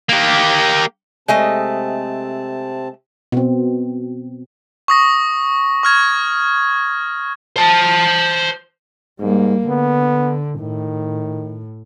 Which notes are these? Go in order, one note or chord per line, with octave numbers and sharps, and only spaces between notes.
A#3 G4
C3 G#3 A3 C4 D#5 A5
B2 C4
C#6 D#6 A#6
C#6 F6 G#6
C5 A5
G#2 G3 A#3
D3 B3
A2 D#3